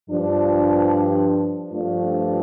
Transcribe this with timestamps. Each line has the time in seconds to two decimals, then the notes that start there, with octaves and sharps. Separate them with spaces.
0.10 G2 F3 D4
1.70 G2 F3 A3 D4 F4